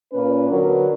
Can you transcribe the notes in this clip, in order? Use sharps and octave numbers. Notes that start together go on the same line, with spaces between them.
A#2 A#3 C#4 B4
D3 F#3 B3 D4 A#4